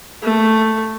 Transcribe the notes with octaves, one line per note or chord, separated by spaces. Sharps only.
A3